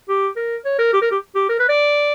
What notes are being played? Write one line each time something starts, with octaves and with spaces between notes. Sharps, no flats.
G4
A#4
C#5
A#4
G4
A#4
G4
G4
A#4
B4
D5